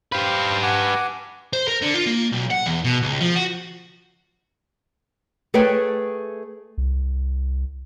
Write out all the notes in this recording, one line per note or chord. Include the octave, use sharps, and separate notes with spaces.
G4 B4 C5 F5
F#5 G#5 D6
C5
A#4
D3
F4
A#3
B1
F#5
E2
B2
C#2
F3
F#4
A3 G#4 A4 B4 C#5 G5
C2